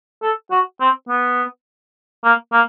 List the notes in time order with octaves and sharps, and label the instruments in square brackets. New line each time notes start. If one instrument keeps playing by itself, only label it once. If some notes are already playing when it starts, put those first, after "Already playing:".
[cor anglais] A4
F#4
C4
B3
A#3
A#3